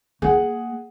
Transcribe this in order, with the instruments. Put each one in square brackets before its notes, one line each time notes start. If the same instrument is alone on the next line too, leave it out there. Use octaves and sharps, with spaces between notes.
[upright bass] A#3 [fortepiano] G#4 F#5